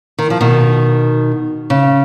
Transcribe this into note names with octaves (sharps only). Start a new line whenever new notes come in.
D#3
F3
B2 D#3
C#3